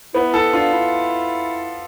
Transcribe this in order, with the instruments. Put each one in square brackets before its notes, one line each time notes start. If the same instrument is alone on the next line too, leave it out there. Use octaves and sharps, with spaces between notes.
[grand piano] B3 [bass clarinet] E4
[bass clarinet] E4 [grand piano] A4
[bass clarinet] D4 [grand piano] F4
[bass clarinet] E4